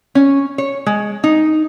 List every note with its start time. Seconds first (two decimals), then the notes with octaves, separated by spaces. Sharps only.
0.15 C#4
0.58 C#5
0.86 G#3
1.24 D#4